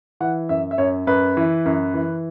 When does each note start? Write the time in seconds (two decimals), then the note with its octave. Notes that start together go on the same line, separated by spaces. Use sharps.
0.20 E3 F#5
0.49 F#2 E5
0.71 E5
0.78 F#2 C#5
1.07 F#2 B4
1.37 E3
1.66 F#2
1.94 E3